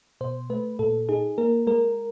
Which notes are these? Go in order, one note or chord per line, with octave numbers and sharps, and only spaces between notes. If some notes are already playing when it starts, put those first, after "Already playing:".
B2 C5
A3 B4
A#2 A4
D#4 G#4
A#3 A#4
G#3 A#4